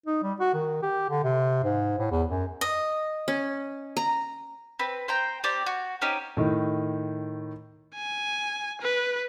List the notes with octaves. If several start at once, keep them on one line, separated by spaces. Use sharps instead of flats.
D#4
G3
F#4
D#3
G4
D3
C3
G#2
A2
E2
F#2
D#5
C#4
A#5
C4 B4
C5 G5 A#5
C4 G4 D5
F#4
C4 C#4 D#4 G4
A2 D#3
G#5
B4